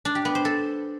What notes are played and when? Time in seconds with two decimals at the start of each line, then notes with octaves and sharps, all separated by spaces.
0.05 D4
0.15 G4
0.25 B3
0.35 C5
0.45 A4